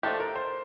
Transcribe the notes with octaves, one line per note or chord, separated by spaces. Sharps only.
F3 A3 D4 G4 A4
A#4
C5